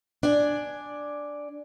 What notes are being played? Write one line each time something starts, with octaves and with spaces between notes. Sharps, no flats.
D4 D5 G#5